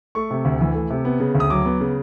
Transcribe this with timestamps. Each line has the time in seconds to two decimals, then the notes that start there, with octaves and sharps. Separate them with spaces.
0.15 A3 C#6
0.31 C3
0.45 D2
0.61 E3
0.75 A3
0.90 C3
1.05 B3
1.20 C#3
1.35 D2
1.40 D#6
1.50 F#3 D6
1.65 B3
1.80 C#3